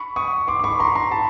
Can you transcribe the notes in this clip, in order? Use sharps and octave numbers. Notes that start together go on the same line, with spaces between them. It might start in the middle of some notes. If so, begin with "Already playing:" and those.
Already playing: B5 C#6
C#6 D#6
C6 D6
D6
B5 C#6
A#5 C6
A#5 C6
A5 B5